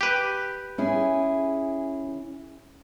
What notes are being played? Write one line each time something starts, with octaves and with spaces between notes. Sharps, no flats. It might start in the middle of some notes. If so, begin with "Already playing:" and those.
G4 B4
C#4 E4 G#4